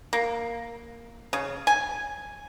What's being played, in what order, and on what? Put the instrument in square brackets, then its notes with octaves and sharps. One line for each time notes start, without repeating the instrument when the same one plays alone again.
[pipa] A#3
C#3
G#5